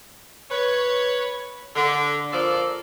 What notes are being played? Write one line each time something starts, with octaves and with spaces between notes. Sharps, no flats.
B4 C#5
D3
F3 A#3 A4 D5